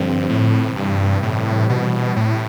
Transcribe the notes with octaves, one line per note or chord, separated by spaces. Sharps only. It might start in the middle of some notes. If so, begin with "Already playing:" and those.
Already playing: G2 D3 F3 C4
A2
G2 C3 E3 G3
A2
B2
A2